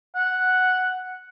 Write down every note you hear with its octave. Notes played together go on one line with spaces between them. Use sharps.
F#5